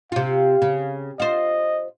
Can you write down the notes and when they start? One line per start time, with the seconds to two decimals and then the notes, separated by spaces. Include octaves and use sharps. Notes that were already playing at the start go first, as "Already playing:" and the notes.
0.12 C3 F4 F5
0.62 C#3
1.20 F4 C5 D#5